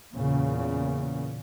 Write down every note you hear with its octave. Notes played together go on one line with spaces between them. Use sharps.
E2 A#2 C#3